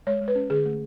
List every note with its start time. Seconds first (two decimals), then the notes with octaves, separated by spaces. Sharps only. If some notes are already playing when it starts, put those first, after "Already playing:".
0.07 G#3 C#5
0.21 G#3
0.28 B4
0.35 C#4
0.50 D3 G#4
0.65 A3